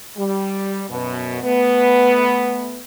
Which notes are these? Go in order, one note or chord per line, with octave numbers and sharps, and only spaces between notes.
G3
F#2 B2
A3 B3